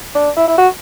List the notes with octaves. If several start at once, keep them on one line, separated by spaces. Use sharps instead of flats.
D4
E4
E4
F#4